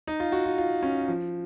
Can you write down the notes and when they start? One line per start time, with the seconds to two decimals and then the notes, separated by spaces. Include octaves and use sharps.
0.07 D#4
0.20 F4
0.32 F#4
0.45 F4
0.58 F4
0.83 C#4
1.08 F3